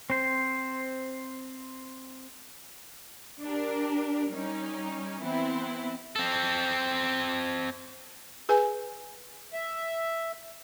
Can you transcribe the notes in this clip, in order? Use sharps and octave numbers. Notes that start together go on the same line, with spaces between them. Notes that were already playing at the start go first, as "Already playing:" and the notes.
C4 C5
D4 G4 A#4
G3 C#4 D#4
E3 B3 C4 E4
C4 A4
G#4 B4 G#5
E5